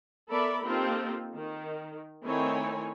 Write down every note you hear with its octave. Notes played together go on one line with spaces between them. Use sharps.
B3 A4 A#4 D5 E5 B5
A#3 C4 D#4 F4 G4 A4
D#3
D#3 A3 C4 E4 C#5 G#5